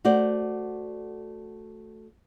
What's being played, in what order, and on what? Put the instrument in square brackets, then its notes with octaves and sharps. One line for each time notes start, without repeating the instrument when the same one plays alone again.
[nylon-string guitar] A3 F#4 C5 D5